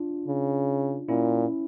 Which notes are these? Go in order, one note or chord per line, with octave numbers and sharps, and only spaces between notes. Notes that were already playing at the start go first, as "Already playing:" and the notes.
Already playing: D4 F4
C#3
A#2 C#4 E4